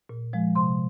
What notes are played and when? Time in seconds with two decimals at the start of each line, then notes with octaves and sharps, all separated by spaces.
0.09 A#2
0.33 F3 G#3
0.55 C3 C6